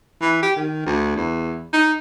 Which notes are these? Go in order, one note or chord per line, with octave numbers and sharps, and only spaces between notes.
E3
G4
D#3
D2
E2
D#4